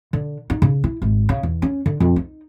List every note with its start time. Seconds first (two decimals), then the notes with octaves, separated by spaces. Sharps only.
0.13 D3
0.50 D#4
0.62 C#3
0.84 E4
1.02 G#1
1.29 C#3
1.43 E2
1.62 C#4
1.86 D3
2.00 F2
2.16 D#4